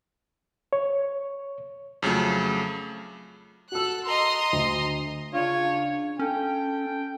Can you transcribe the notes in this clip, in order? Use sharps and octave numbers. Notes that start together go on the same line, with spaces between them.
C#5
F2 C#3 F#3 A3
F#4 A4 E6 F#6
D#5 A#5 C6
D2
C#3 D4 F4 C#5
C#4 A4 G5